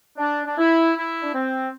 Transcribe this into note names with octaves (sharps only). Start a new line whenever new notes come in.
D4
D4
E4
E4
D4
C4